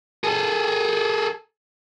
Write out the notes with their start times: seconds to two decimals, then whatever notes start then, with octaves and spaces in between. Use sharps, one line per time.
0.24 G#4 A4